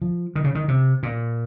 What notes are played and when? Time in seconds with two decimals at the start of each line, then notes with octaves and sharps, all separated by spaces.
0.02 F3
0.35 D#3
0.44 C#3
0.55 D#3
0.68 C3
1.03 A#2